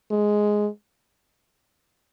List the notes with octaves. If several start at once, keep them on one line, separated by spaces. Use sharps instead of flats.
G#3